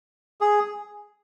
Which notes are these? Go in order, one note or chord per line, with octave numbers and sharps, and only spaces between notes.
G#4